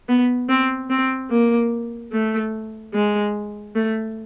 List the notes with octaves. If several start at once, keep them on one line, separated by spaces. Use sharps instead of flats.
B3
C4
C4
A#3
A3
G#3
A3